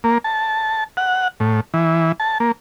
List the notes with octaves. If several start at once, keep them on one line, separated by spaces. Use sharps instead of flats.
A#3
A5
F#5
A2
E3
A5
A#3